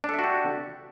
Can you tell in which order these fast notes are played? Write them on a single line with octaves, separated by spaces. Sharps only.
D4 A4 E5 F#4 G4